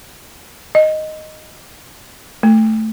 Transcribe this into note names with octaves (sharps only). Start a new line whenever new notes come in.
D#5
A3